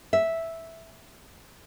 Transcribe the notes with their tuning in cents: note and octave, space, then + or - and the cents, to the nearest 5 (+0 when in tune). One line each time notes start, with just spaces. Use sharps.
E5 -5